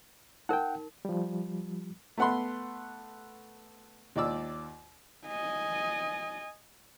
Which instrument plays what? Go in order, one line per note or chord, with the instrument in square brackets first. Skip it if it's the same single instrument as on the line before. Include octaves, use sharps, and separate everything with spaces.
[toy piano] D#4 A#4 [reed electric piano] F#5 G5
[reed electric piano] F3 G3
[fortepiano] A3 B3 F#5 B5 C6
D#2 F4 D5 E6
[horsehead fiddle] D#5 G#5